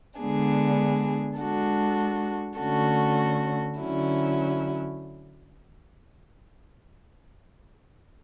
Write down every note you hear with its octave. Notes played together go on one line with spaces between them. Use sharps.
D3 G#3 B3 D4 G#4
G#3 D4 F#4 A4
D3 A3 C#4 F#4 A4
D3 F#3 C#4 E4